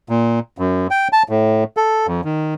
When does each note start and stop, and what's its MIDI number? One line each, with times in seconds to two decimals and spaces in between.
0.09 0.39 46
0.58 0.87 42
0.91 1.08 79
1.13 1.23 81
1.29 1.64 45
1.77 2.07 69
2.07 2.21 41
2.24 2.54 51